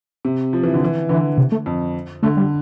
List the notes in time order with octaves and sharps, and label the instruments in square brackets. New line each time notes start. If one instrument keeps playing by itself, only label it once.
[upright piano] C3
F3
E3
D3
E3
[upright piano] D3 [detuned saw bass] E3
[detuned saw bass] C3
A3
[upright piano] F2
[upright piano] D3 [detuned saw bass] A3
[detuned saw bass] G3